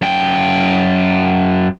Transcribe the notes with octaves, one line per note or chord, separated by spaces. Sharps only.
F#2 G5